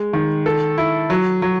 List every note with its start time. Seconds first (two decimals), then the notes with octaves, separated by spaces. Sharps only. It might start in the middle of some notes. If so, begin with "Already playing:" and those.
Already playing: G#3
0.13 D#3
0.46 A4
0.78 E4
1.10 F#3
1.42 F#3